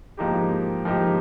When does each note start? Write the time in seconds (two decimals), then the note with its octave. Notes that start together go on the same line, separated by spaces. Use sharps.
0.17 G#2 F3 A#3 D#4 G4
0.85 G#2 F3 A#3 D#4 G4